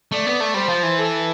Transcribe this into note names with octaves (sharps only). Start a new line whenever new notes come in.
A3 D5
B3
A3
G3 C5
F3
E3
A4